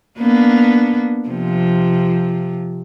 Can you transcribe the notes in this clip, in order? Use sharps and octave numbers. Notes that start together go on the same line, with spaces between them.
A#3 B3 D4
C3 F3